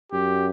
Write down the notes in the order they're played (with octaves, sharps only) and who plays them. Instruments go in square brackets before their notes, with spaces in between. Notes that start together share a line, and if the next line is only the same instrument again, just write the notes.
[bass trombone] F#2 [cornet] G4